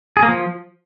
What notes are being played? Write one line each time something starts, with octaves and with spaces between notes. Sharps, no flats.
G#4
A#3
F3